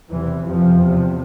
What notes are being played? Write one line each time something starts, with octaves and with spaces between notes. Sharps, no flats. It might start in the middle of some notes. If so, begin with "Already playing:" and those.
E2 C3 E3
F2 C3 F3
E2 C3